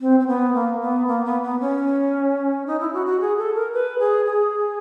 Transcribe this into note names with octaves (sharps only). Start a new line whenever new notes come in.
C4
C4
B3
A#3
B3
A#3
B3
B3
C#4
D#4
E4
F#4
F#4
G#4
A4
A#4
B4
G#4
G#4